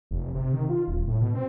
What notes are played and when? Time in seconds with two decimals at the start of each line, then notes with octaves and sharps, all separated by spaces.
0.11 F1
0.35 C3
0.53 D#3
0.70 F4
0.88 D#1
1.08 A2
1.21 B2
1.35 C4